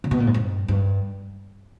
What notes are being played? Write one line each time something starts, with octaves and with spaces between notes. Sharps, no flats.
C#3
B2
A#2
G#2
G2
G2